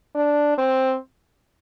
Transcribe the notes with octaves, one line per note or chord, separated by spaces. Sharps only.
D4
C4